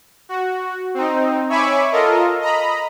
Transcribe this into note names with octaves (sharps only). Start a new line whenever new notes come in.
F#4
C4 D#4
C#5 E5 G#5 B5 C#6 D6
F4 A4 A#4 D#5
D#5 A#5 B5